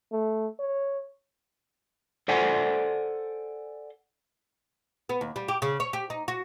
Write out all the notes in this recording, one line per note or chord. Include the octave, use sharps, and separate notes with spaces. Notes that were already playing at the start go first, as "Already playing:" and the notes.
A3
C#5
A4 C5 D5 F#5 G#5
B3
D#2
G3
G4
C#3
C#5
G4
D#4
F#4